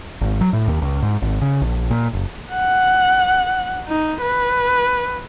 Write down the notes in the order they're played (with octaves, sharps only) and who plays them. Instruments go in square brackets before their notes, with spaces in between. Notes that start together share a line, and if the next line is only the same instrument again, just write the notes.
[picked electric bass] G#1
F#3
A2
D#2
C#2
G#2
G#1
C#3
A#1
A#2
F#1
[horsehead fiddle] F#5
D#4
B4